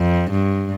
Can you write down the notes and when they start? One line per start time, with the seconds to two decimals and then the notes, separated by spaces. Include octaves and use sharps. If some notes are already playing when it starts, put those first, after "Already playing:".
Already playing: F2
0.31 G2